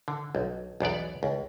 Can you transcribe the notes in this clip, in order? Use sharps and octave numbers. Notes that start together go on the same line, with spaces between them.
D3
B1
B1 E2 B3 D5
C#2